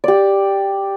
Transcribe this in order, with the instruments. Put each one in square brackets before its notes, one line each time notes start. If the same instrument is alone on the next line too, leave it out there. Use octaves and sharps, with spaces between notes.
[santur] G4 D5